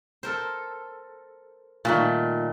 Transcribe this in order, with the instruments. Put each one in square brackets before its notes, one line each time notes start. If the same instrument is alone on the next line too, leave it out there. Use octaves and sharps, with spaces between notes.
[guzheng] A4 A#4 C5
[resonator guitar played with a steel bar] A#2 [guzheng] D#3 G3 A3